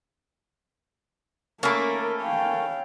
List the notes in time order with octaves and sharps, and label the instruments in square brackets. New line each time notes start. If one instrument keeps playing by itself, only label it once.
[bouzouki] A3 A#3 [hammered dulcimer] C#4 A4 B5 [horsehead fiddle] A#4
[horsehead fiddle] F5 G5